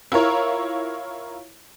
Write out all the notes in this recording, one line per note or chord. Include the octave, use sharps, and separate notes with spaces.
E4 F4 A#4 C#5